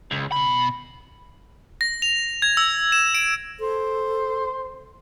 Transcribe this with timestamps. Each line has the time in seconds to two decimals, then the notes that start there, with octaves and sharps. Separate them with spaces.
0.11 C#2
0.32 B2 B5
1.81 A#6
2.02 F7
2.42 G#6
2.57 E6
2.92 E7
3.14 D7
3.60 A4 C5